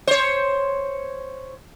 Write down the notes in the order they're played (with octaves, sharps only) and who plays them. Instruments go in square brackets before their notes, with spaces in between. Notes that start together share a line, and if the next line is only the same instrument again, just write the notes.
[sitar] C5 C#5